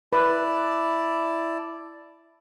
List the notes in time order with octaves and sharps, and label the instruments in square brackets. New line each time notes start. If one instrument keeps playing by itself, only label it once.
[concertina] E4 D5 A5 [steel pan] B4